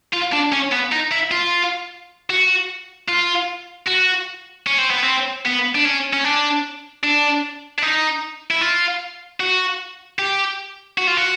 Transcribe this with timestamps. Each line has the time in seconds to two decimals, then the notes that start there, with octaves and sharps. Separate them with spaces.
0.13 F4
0.32 D4
0.52 C#4
0.72 B3
0.92 D#4
1.12 E4
1.31 F4
2.30 F#4
3.09 F4
3.88 F#4
4.67 C#4
4.78 C4
4.90 B3
5.03 C4
5.46 B3
5.75 D4
5.85 C#4
6.13 C#4
6.24 D4
7.03 D4
7.79 D4
7.82 D#4
8.51 E4
8.61 F4
9.40 F#4
10.19 G4
10.98 F#4
11.07 F4
11.17 F#4